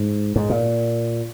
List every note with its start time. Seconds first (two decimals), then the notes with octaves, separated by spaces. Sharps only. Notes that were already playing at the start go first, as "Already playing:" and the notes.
Already playing: G#2
0.36 G#2
0.50 A#2